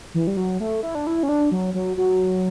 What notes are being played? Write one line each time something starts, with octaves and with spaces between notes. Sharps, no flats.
E3
G3
F#3
A3
E4
D4
E4
C#4
D4
F#3
F#3
F#3